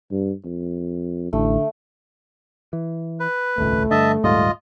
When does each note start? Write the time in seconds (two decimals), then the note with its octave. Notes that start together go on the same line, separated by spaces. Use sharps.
0.11 G2
0.45 F2
1.33 A1 D3 A3
2.73 E3
3.20 B4
3.58 D#1 G#1 C#2 A3
3.91 G2 D3 D#5 E5 A5
4.24 D#1 G#2 G3 F4 D#5